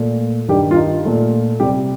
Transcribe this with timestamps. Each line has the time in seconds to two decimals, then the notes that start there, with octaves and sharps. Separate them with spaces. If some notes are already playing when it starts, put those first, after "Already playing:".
Already playing: A#2 A3
0.48 G2 D#3 G3 G4
0.71 F4
0.76 D#4
1.05 A#2 A3
1.60 C3 G3 G4